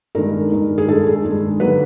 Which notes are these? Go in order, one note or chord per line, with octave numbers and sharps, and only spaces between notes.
G2 D#3 G#3 A#4
G2 D#3 G#3
G#4
G2 D#3 G#3 A4
G#4
G2 D#3 G#3
D3 F#3 A#3 B4